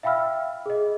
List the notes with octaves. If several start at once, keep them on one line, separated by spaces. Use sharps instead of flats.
E5 F5 G5 B5 E6 F6
G#4 D#5